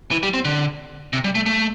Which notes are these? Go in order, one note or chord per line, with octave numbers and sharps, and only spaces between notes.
E3
G3
C4
D3
C3
G3
A3
A3